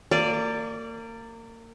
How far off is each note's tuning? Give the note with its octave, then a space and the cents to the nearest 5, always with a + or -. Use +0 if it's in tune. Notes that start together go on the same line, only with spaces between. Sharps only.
A#3 -30 D5 +0